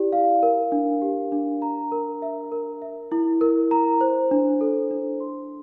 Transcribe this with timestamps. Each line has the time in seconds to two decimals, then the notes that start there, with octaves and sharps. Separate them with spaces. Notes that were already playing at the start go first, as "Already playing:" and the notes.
Already playing: E4 G4 D5
0.12 F5
0.43 A#4
0.72 D4
1.02 G4
1.32 D4
1.62 A#5
1.92 A#4
2.22 E5
2.52 A#4
2.82 E5
3.12 E4
3.41 A#4
3.71 A#5
4.01 C5
4.31 D4
4.61 A4
4.91 D4
5.20 C6